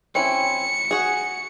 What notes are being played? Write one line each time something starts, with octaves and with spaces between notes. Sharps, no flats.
C4 C#4 E4 C#7
F#4 G#4